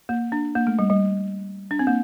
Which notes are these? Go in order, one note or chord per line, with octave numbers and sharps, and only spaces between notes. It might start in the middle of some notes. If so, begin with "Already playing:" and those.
A#3
D4
A#3
A3
G3
G3
D4
C4
A#3